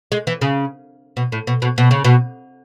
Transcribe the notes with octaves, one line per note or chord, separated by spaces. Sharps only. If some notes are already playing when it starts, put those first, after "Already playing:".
G#3
E3
C#3
B2
A2
B2
B2
B2
C#3
B2